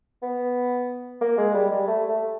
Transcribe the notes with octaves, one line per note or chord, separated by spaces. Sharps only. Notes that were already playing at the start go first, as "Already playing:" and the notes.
B3
A#3
G#3
G3
G3
A3
A3